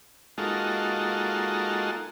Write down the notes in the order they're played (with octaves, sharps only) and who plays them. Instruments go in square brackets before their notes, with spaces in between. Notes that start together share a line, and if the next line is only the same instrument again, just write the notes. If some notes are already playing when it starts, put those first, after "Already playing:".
[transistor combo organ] G#3 A#3 D#4 F4 F#4 A4